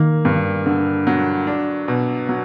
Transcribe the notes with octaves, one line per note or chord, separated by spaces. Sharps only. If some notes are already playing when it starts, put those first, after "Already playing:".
Already playing: D#3 A#3
G2
D3
F#3
D4
B2
F#3